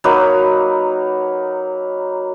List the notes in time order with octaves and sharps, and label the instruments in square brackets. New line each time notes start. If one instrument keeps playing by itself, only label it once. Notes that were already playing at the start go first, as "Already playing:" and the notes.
[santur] F#3 A#3 D#4 B4